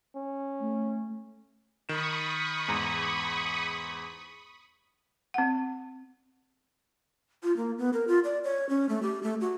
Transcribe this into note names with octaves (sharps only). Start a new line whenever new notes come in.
C#4
A3
D#3 B5 C#6 D#6 E7
E2 G#2 A#5
C4 F#5
F4
A#3
B3
A#4
F4
D5
C#5
C#4
A3
G4
A3
F#4